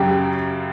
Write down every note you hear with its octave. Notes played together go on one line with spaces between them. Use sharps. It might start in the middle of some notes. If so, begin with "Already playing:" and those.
Already playing: F#2 C#3 F#3 C#4 G4